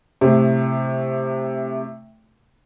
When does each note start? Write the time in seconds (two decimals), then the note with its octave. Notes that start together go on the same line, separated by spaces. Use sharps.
0.21 A2 C3